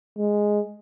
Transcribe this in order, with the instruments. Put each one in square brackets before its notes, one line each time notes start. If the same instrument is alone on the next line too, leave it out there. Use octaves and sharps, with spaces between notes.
[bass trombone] G#3